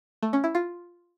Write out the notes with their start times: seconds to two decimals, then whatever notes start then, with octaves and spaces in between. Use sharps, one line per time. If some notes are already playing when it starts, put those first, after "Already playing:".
0.23 A3
0.33 C#4
0.44 E4
0.55 F4